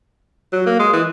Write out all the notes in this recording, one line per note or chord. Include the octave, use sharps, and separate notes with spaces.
F#3
A#3
G#3
E3